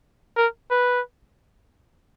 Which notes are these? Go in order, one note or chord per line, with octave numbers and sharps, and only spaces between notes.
A#4
B4